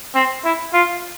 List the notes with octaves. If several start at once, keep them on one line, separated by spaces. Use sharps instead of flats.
C4
E4
F4